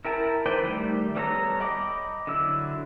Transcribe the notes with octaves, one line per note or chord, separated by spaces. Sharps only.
E4 A#4 G5 A5 A#5
D#3 B4 C5 D5 G5
D#3 G3 A3
G3 B3 A4 C#5 A#5
D#5 G5 B5 D6
D3 F#3 E4 E6